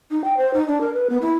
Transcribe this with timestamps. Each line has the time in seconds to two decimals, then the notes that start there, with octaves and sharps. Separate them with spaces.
0.11 D#4
0.24 G5
0.37 C5
0.54 D#4
0.68 D4
0.81 A#4
0.93 B4
1.10 B3
1.22 E4